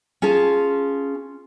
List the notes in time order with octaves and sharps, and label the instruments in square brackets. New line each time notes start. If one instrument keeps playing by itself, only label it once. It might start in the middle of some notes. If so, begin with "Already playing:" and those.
[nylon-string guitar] C#4 F4 G#4 A5